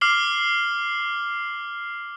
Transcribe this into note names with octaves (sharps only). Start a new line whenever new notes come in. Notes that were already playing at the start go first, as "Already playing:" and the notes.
D6 F6 C7 F#7 G7